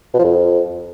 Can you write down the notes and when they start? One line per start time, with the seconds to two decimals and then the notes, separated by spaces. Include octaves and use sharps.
0.14 B2
0.19 F3
0.24 F2